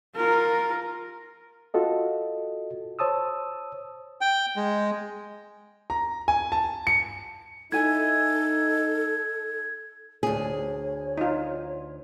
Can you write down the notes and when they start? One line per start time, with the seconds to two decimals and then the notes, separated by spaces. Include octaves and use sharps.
0.16 F4 A#4
1.74 F4 F#4 A4 D#5
2.99 C5 C#5 A5 D#6 E6
4.21 G5
4.56 G#3
5.90 A#5
6.28 G#5
6.52 A5
6.87 C#7
7.72 D#4 E4 A4 G#5 G#6
10.23 D2 G#4 C#5
11.18 D#4 F4